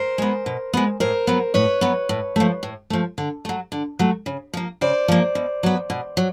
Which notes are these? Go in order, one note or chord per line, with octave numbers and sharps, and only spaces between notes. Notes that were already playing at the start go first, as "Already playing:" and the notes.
Already playing: A#4 C5
G#3 B3
B2
G#3 B3
A2 A#4 C5
F#3 B3
A2 B4 C#5
F#3 B3
A2
F3 A3
A2
F3 A3
D3
F#3 A3
D3
F#3 A3
C#3
F3 A#3
C#3 C5 D5
F3 A#3
B2
F#3 B3
B2
F#3